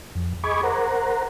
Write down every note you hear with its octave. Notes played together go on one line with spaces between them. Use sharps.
F2
G#4 D#5 B5 C#6 D6 G#6
A#4 C5 F#5 A#5